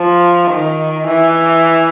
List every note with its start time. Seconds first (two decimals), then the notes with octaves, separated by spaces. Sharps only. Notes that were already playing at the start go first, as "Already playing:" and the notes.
Already playing: F3
0.51 D#3
1.08 E3